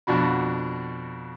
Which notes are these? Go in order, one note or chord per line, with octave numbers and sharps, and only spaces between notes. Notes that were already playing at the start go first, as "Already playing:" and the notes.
F2 B2 D4 F#4 B5